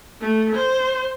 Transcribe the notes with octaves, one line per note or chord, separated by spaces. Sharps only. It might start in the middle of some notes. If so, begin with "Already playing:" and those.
A3
C5